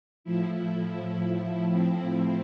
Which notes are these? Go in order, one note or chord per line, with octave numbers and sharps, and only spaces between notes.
A2 F3 E4
C4